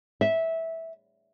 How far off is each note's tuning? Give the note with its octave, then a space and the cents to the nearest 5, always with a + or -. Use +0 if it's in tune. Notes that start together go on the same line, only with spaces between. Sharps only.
E5 -15